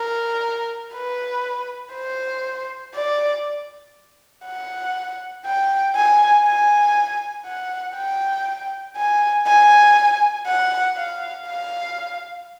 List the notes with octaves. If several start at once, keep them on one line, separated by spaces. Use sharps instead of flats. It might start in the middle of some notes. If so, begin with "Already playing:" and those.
Already playing: A#4
B4
C5
D5
F#5
G5
G#5
G#5
F#5
G5
G#5
G#5
F#5
F5
F5